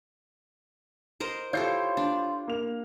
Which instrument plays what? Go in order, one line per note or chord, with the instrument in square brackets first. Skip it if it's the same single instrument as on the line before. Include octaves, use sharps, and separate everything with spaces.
[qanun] A#4 C5 D#5
[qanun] E4 G4 A4 [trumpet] F4 [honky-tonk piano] C#5 G6 C7
[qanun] D4
[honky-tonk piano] A#3 F7